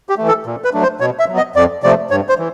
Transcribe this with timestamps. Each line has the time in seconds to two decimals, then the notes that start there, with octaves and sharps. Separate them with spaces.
0.09 G4
0.18 E3 A3
0.28 A4
0.46 A#2
0.64 B4
0.73 F#3 A3 D4
0.82 C5
1.00 B2 C#5
1.19 E5
1.28 F#3 B3
1.37 D#5
1.56 F2 D5
1.83 C3 F3 A3 D5
2.11 G2 C#5
2.29 C5
2.39 E3